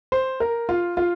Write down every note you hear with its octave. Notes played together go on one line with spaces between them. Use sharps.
C5
A#4
F4
F4